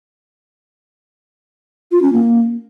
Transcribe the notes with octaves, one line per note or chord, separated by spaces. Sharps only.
F4
C#4
A#3